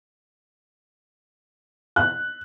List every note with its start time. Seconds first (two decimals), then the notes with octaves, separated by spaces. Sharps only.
1.96 F#6